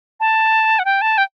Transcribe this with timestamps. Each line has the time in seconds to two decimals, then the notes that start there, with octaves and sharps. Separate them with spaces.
0.20 A5
0.79 F#5
0.85 G5
1.02 A5
1.18 G5